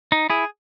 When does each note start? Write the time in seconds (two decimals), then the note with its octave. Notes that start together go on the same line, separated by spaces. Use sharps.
0.12 D#4
0.30 E4 G#4